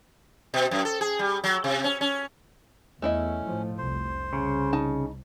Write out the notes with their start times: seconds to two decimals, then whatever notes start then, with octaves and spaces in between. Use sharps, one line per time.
0.54 B2
0.71 F#2
0.85 A4
1.01 G#4
1.19 G3
1.44 F#3
1.64 C3
1.84 C#4
2.01 C#4
3.02 E2 A3 C#4 E4 D#5
3.46 A2 F3
3.78 F1 C2 C5
4.33 C2 C#3
4.73 D#4 A5